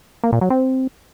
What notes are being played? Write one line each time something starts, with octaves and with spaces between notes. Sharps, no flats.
A#3
A#2
F#3
C4